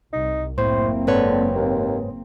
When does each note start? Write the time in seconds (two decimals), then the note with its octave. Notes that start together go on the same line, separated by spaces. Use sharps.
0.13 C2 D#4
0.58 F#1 A2 A#3 C4 C5
1.07 G#2 D3 B4 C#5
1.56 D#2